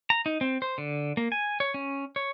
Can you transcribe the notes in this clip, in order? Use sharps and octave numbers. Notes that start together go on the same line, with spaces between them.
A#5
D#4
C4
C5
D3
A#3
G#5
C#5
C#4
C#5